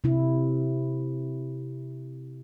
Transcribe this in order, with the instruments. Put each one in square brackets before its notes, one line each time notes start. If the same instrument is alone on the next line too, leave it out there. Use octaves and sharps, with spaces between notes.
[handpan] C3 E4